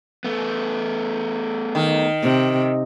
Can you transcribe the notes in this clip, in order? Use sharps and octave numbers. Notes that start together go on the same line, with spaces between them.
A3 B3
D#3
C3